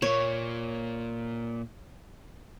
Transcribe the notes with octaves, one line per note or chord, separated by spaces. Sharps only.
A#2 A#3 C#5